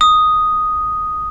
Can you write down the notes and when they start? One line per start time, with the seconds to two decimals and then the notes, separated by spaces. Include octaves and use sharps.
0.01 D#6